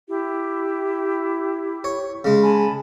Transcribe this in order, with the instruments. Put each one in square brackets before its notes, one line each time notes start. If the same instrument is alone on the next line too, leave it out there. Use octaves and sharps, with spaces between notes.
[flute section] E4 G4
[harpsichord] C#5
C#3 G#3
[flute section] G#5 A5 B5